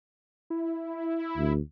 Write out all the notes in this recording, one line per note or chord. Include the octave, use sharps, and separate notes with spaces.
E4
D2